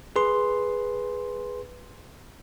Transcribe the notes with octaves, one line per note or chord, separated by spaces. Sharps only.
G#4 B4 C6